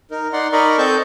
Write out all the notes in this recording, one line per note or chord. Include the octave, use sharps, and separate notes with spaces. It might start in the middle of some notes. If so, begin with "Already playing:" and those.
D#4 A#4
D#4 D5 F#5 C6
D#4 A#4 D5 D#5 B5 C#6
C4 A4 D#5 A5 C#6 G6